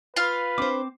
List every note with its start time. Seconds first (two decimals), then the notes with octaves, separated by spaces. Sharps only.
0.16 F4 B4 F5
0.58 C4 D4 C5 D6